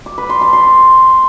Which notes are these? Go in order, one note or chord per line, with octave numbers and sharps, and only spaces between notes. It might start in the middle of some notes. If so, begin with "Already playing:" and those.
D6
B4
C6
A5
C6